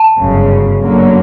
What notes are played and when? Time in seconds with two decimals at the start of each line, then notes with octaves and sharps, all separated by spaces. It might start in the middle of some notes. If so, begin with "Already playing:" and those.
Already playing: A5
0.18 G1 F#2 C#3
0.82 G1 F#2 D3 F#3 A#3